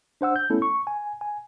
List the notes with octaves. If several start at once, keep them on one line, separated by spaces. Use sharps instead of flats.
D4 C5 F#5 E6
G6
A3 B3 C#4 E4 A4
C#6
G#5
G#5